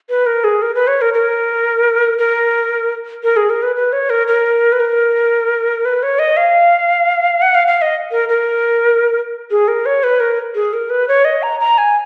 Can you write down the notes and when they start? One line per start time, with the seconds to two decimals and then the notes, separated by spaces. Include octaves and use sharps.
0.10 B4
0.26 A#4
0.44 G#4
0.62 A#4
0.75 B4
0.87 C#5
1.01 A#4
1.14 A#4
2.18 A#4
3.23 A#4
3.37 G#4
3.50 A#4
3.63 B4
3.76 B4
3.93 C#5
4.10 A#4
4.27 A#4
4.72 B4
4.80 A#4
5.85 B4
6.03 C#5
6.19 D#5
6.37 F5
7.42 F#5
7.55 F5
7.68 F5
7.82 D#5
8.11 A#4
8.29 A#4
9.51 G#4
9.68 A#4
9.86 C#5
10.03 B4
10.20 A#4
10.55 G#4
10.73 A#4
10.90 B4
11.08 C#5
11.25 D#5
11.43 A#5
11.60 A#5
11.78 G#5